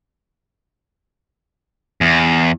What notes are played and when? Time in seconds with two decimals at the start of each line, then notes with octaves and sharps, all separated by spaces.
2.01 E2